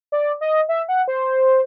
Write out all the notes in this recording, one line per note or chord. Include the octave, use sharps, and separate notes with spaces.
D5
D#5
E5
F#5
C5